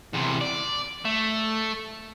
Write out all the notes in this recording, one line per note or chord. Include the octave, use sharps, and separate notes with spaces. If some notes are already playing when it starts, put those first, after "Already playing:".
E2 C3
D5
A3